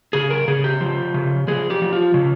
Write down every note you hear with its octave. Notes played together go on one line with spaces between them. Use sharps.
C#3 G#4
A#4
C#3 G#4
G4
F3
C#3
F3 G#4
G4
F3
F4
C#3